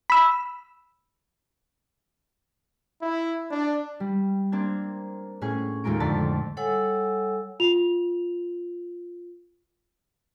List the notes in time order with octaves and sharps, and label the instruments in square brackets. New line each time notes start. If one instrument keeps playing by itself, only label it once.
[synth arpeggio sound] B5 E6
[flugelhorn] E4
D4
[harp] G3
A#3 C4 D4 G#6
A2 C#4 G#4
D#2 A2 G#3 F4 A#4 D7
F2 D3 D5 A5 A6 B6
[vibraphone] G3 A4 C#5 F#5 G#5 E6
[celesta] F4 F7